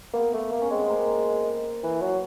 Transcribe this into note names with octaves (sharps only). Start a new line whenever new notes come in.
A#3 B3
A3
A#3
C#4
G#3 C4
B3
A#3
E3
F#3